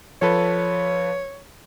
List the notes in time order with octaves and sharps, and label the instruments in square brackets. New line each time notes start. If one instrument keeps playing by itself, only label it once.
[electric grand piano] F3 A4 B4 [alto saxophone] C#5